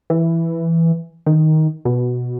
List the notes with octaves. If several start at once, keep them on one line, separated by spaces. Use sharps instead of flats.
E3
D#3
B2